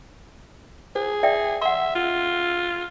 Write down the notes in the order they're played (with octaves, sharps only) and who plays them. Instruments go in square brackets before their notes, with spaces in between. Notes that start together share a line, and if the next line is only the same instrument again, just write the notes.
[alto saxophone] G#4 [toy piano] C5
[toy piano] D5 E5 G5
[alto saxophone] E5 [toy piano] F#5 C6
[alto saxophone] F4